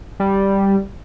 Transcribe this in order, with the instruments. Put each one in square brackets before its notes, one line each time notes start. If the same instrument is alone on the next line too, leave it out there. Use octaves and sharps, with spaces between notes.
[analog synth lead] G3